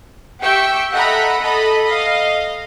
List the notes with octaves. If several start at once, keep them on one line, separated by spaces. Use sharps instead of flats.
G4 E5 G5 C#6 E6
A4 D#5 E5 F#5 A#5 B5
A4 D#5 B5
D#5 F5